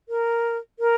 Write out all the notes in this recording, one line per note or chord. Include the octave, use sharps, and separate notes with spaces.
A#4
A#4